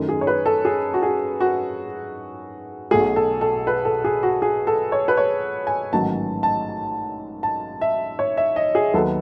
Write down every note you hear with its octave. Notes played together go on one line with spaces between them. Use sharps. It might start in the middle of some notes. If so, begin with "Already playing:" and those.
Already playing: F#2 D#3 A3
G#4
C#5
B4
A4
G#4
F#4
G#4
F#4
B1 B2 A3 G#4
A4
A4
B4
A4
G#4
F#4
G#4
A4
C#5
B4
C#5
G#5
A1 G#2 D#3 F#3 A5
A5
A5
E5
C#5
E5
D#5
G#4
D#2 D#3 F#3 B3 A4